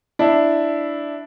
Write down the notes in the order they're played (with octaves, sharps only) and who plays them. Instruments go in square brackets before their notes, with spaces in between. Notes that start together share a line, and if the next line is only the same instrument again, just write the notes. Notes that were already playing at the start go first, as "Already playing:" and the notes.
[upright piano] D4 E4